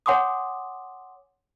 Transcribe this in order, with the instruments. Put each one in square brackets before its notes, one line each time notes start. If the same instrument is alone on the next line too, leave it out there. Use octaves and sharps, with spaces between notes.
[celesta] C#5 F#5 G#5 C6 D6 D#6